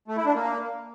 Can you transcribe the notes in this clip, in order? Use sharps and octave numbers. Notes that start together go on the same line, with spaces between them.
A3
E4
D4
A#3